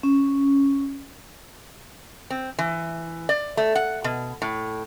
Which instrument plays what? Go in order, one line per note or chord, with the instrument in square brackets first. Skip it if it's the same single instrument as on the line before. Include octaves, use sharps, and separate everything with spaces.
[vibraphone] C#4
[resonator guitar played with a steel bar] C4
E3
D5
A3
F#5
B2
A2